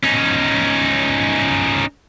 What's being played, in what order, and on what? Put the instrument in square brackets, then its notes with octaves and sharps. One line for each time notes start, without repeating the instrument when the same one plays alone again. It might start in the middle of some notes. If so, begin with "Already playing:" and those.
[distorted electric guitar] C#4 D#4